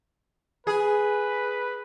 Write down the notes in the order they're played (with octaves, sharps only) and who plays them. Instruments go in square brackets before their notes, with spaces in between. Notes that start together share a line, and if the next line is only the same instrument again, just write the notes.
[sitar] G#4 [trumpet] B4